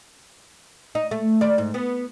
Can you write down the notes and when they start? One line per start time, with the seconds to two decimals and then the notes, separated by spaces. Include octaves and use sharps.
0.95 D#4
1.11 A3
1.41 D5
1.58 G#2
1.74 B3